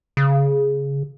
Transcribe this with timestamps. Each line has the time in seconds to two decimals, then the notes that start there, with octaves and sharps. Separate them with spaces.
0.17 C#3